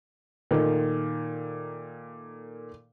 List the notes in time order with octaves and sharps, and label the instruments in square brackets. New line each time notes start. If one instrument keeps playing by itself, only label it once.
[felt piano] A#2 D#3 A3 A#3